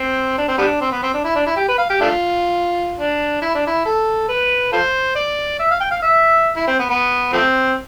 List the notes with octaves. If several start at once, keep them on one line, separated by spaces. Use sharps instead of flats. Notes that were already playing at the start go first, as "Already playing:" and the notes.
Already playing: C4
D4
C4
G3 B3 D4
C4
B3
C4
D4
E4
D4
E4
G4
B4
F5
G4
A3 D4 F4
D4
E4
D4
E4
A4
B4
F4 A4 C5
D5
E5
F5
G5
F5
E5
E4
C4
B3
B3
F3 A3 C4